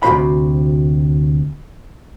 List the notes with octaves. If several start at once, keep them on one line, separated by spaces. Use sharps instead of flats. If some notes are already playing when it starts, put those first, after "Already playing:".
D2 C3 D#3 F#4 C5 B5